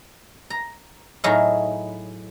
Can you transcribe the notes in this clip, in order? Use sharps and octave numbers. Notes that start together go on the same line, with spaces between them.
A#5
A2 F#3 D#4 E4 G#4 F5